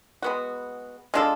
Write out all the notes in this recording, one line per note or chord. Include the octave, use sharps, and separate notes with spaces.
G#3 B3 F#4
G#3 D4 F4 A4